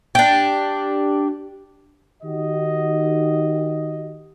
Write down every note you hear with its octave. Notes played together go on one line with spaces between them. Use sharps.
D4 G4
D#3 F#4 G4 D#5